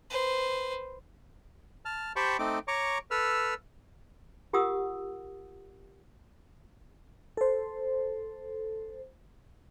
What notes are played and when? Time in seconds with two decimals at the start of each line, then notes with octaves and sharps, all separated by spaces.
0.10 B4 C5
1.85 A5 F6
2.16 G4 C5 G5 A5 B5 C#6
2.39 A3 C4 D#4 D6
2.68 C#5 A#5 C#6 D6
3.11 A4 B4 E6 F6
4.53 F4 G4 A#4 F#5 D#6 E6
7.37 A4 C5